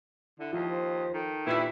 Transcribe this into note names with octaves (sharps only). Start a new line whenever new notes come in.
D3 E4
D#2 F3
C5
D#3 A4
G2 A#2 E3 E4 G#6 B6